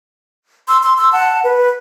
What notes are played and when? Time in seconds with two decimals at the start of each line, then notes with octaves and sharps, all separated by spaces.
0.68 C6 E6
0.82 C6 E6
0.98 C6 E6
1.12 F#5 A5
1.43 B4